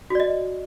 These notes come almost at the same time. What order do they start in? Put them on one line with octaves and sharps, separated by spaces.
F#4 D5 D#5